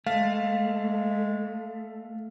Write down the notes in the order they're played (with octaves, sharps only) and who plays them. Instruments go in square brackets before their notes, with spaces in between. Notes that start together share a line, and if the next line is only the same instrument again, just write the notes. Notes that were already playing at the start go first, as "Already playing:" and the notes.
[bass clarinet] G#3 [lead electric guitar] A3 [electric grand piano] F5